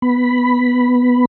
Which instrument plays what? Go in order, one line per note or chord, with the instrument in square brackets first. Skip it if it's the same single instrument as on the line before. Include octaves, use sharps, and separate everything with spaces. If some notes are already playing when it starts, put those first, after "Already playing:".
[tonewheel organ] B3 B5